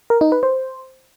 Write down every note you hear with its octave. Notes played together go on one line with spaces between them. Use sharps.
A#4
D#4
B4
C5